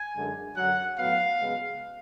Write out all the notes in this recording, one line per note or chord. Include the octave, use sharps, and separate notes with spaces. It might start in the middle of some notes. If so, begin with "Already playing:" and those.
Already playing: G#5
F#2 D3 G#3
F#2 D3 F#3 F#5
A2 F#3 B3 F5
C#3 G#3 B3